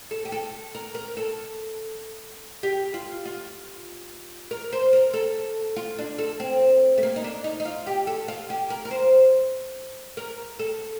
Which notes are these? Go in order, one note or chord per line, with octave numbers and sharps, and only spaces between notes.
A4
G4
A4
A#4
A#4
A4
G4
F4
F4
A#4
C5
A#4
A4
F4
D4
A4
C4
A3
A#3
D#4
D4
D#4
D#4
F4
G4
A4
F4
G4
A#4
A#4
C5
A#4
A4